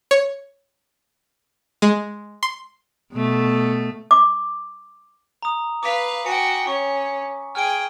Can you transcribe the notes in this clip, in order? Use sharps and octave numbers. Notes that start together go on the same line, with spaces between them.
C#5
G#3
C6
B2 A3
D6
A#5 D#6
B4 F5 D6 B6
F#4 G5 G#5 C#7
C#4 C#6
G#4 G5 F6 D7